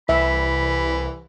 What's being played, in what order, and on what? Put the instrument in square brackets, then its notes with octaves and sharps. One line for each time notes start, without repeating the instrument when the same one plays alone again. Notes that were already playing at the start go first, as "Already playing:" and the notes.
[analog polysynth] C2 [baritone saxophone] E3 [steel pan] E5 [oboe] B5